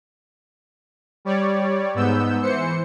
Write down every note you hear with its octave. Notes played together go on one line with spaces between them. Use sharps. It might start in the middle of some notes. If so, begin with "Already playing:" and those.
G3 C#5 D5
G#2 B3 E6 G6
E3 C5 C#7